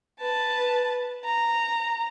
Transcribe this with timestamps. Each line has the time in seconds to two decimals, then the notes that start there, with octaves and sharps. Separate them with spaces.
0.21 B4 A5
1.25 A#5